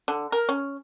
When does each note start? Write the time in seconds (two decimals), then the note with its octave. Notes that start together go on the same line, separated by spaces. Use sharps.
0.08 D3
0.32 A#4
0.49 C#4